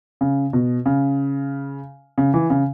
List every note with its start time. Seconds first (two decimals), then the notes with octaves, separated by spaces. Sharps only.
0.21 C#3
0.53 B2
0.86 C#3
2.18 C#3
2.34 E3
2.50 C#3